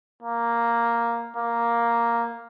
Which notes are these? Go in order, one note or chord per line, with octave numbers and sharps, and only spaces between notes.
A#3
A#3